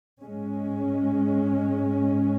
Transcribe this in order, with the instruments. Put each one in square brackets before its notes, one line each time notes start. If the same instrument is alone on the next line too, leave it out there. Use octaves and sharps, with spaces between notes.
[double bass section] G#2 G#3 C#4